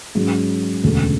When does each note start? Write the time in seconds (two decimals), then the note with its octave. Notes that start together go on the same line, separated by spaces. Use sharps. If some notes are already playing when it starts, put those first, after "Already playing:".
0.15 G#2 F#3 C#4
0.84 E1 D2 C#3